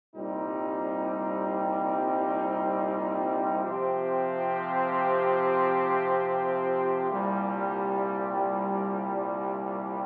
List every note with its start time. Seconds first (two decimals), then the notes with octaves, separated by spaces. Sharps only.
0.15 C2 A#2 G3 C4 D#4
3.63 C3 F3 C4 G4
7.10 C2 A#2 G3